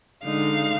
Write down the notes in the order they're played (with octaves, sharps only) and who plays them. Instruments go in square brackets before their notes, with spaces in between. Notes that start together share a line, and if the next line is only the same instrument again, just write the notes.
[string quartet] D3 G#3 D#4 F5